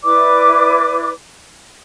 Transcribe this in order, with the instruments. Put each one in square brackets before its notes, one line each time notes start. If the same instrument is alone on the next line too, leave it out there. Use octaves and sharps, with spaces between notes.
[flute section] E4 B4 D5 D6